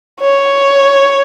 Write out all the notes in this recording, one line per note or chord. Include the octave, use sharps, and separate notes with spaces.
C#5